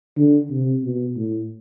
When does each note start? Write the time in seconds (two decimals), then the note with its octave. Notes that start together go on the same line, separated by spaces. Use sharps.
0.17 D3
0.51 C3
0.83 B2
1.16 A2